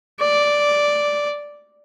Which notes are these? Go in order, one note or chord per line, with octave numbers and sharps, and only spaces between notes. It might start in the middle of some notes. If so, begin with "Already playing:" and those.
D5